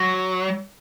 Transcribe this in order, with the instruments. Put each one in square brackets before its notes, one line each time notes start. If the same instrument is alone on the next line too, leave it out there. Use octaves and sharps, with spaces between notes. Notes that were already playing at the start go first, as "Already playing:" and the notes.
Already playing: [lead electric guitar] F#3